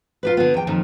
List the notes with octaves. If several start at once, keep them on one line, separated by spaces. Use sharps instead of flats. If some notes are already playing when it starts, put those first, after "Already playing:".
F4 G4 B4
D3 B3
E2 G5
F2 A#2 D#3